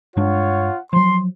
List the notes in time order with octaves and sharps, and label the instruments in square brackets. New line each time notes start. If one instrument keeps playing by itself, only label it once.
[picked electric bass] G2 G#3 D4 [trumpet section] F4 C#5 F#5
[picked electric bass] F3 F#3 [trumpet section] C6